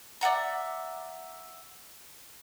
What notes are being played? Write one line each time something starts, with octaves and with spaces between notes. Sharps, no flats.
D5 E5 F#5 A#5